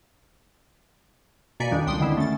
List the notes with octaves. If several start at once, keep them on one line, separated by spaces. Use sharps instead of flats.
B2 A#3 D5 G#5 B6 C#7
F2 D#3 G3 D4
C#2 G5 C6 D#6
D3 D#3 G#3 B3 C4 E4
A3 C#4 A6